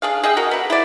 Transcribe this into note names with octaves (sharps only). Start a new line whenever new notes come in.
D4 G#4 F5
G#4 D#5 E5 G5
F#4 A#4
B3 D4
E4 C5 D5